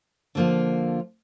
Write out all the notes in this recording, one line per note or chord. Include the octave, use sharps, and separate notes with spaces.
D3 F3 A#3 F4